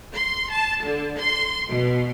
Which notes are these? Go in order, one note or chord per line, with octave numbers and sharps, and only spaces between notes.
C6
A5
D3
C6
B2